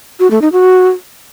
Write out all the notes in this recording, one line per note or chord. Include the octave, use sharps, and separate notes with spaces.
F#4
A3
D#4
F#4